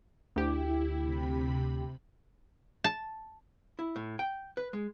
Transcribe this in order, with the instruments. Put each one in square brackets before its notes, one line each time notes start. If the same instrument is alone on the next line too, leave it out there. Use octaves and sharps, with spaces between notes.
[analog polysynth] D2 G4 [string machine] E4
[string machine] C3 B5
[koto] A5
[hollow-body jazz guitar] E4
A2
G5
B4
G#3